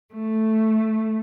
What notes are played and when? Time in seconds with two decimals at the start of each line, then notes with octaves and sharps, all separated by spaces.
0.13 A3